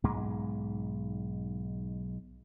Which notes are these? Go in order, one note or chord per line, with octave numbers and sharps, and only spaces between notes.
B1 G#2 G#3